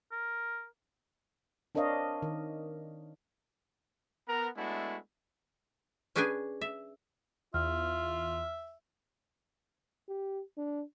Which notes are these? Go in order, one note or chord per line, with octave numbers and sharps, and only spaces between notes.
A#4
C4 D4 A#4 C#5 D#5 F5
D#3
B3 A#4 A#5
G#3 A3 B3 D4 E4 F#4
C#4 D4 G#4 B4 G5 G#5
E5
E2 F4 E5 F6
G4
D4